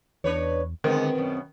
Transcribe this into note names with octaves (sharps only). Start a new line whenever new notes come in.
E2 D4 B4 C#5
D3 D#3 G#3 B3 C4
F#2 B2